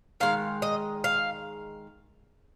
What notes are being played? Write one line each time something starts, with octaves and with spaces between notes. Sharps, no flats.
D#3 G#3 F5
D#5
F5